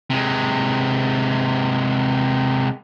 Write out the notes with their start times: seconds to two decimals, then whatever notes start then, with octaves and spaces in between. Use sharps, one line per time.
0.10 C3 G#3